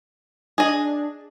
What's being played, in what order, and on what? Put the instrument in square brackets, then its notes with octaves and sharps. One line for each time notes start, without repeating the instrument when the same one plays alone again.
[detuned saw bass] D4 [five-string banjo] G#4 D#5